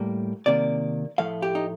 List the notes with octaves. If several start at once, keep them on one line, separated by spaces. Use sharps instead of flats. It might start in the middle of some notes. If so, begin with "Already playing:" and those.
Already playing: A2 G3 A#3
C3 D#3 A#3 D5
A2 F3 A3 F5
G4
D#4